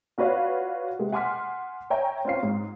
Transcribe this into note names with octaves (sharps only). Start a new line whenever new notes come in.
F4 F#4 B4 C#5 D5 F5
C3 G#3
F#5 G#5 C6 D6 F6 B6
C#5 E5 G5 G#5 A#5
C4 C#4 F4 C7
G#2